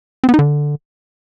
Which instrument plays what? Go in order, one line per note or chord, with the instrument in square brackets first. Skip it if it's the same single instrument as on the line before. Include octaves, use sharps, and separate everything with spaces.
[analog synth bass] C4
B3
D#4
D3